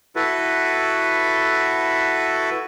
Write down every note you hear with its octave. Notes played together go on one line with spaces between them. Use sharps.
E4 F#4 A4 B4